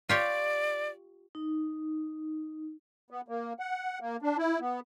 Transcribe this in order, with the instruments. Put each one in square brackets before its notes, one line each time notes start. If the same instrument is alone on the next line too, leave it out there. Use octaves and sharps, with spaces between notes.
[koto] F4 G4 C#5 [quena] D5
[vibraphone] D#4
[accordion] B3
A#3
F#5
A#3
D4
E4
B3